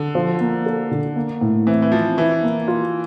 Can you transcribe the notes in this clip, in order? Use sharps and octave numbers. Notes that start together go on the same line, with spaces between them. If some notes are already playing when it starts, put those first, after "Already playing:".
Already playing: D3 A4
F3
A#3
A4
D3
A#3
A2
E3 C4
E3
F3 C4
E3 E4
A#3
F4